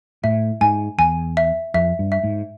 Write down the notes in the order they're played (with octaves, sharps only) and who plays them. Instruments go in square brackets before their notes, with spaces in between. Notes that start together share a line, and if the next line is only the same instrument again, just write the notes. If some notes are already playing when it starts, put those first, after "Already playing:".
[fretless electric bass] A2 [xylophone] E5
[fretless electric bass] G#2 [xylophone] G#5
[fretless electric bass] E2 [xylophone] G#5
[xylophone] E5
[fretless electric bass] F2 [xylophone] E5
[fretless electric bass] G2
[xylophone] E5
[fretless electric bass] G#2